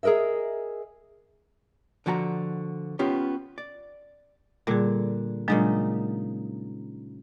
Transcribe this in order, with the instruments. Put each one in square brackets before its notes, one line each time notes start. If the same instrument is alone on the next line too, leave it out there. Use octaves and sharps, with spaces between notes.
[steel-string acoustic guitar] G#4 A#4 B4 D#5 E5
[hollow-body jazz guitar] D3 F3 F#4 A5 A#5
B3 C#4 F4 G4
D5
[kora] A#2 D3 [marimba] G3 G#4
[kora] A#2 C#3 D#4 [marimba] F#3 G#3 D4